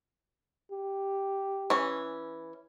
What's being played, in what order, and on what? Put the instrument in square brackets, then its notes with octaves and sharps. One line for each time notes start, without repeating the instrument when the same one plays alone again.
[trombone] G4
[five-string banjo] E3 C#4